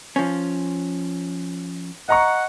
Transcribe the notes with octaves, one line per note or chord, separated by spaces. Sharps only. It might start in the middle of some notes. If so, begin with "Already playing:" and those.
F3 C#4
D#5 F#5 A#5 C#6